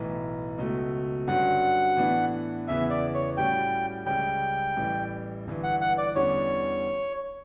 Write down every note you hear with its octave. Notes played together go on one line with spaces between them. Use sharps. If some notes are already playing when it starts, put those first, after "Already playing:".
Already playing: B1 A2 E3
C#2 B2 F#3 A3
G2 D3 F#3 C#4 F#5
A2 E3 B3 D4
E2 C#3 E3 B3 E4 E5
D5
C#5
A2 G3 C#4 F#4 G5
C#2 C#3 G3 C#4 G5
A1 A2 E3 G3
G1 G2 E3
F#5
F#5
D5
E2 D3 G3 C#4 C#5